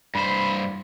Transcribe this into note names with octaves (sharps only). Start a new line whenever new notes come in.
G2 C5 B5